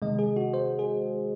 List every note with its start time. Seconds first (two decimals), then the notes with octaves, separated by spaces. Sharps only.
0.02 C3 D#3 G#3 D#5
0.19 G#4
0.36 F#4
0.54 C5
0.79 G#4